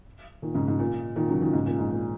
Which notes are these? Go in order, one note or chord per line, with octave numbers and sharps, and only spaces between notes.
A#2 D#3
G#2 C#3
G#2
A#2
A#2 D#3
C#3 F#3
A#2 D#3
G#2 C#3
A#2
G#2
A#2